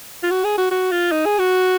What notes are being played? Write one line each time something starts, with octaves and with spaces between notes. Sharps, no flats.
F4
F#4
G#4
F#4
F#4
F4
D#4
G#4
F#4